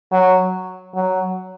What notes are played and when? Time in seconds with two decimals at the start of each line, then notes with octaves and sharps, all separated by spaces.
0.12 F#3
0.95 F#3